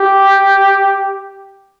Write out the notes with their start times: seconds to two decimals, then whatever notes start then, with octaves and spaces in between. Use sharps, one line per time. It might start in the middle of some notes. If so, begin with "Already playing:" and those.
Already playing: G4